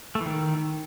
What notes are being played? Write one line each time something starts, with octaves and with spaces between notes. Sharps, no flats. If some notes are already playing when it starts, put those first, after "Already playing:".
A3
E3
D#3